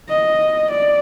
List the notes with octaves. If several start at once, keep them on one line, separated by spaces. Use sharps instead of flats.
D#5
D5